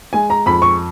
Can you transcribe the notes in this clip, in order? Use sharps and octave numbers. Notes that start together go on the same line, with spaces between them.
G#3 G#5
A#5
F2 B5
C#6